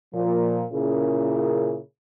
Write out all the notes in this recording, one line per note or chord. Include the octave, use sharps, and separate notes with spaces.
A#2 F3
A#2 C#3 C#4 E4 G#4 A#4